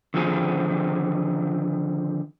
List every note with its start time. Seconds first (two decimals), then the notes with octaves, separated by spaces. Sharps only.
0.14 D3 D#3 F3 C4 F4 G#4